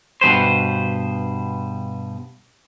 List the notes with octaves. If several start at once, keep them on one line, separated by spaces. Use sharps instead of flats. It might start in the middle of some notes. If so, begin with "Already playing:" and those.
G2 B2 G#3 B4 C5